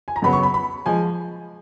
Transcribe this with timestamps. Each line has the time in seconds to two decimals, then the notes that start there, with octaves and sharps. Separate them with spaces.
0.08 G#5
0.16 A#5
0.22 F#2 C#3 F#3 B3 B5
0.33 C#6
0.43 B5
0.54 B5
0.86 F3 G#3 G#5